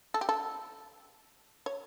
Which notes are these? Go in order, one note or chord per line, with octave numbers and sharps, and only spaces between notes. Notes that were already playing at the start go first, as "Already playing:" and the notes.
A4
G4
A4
C#5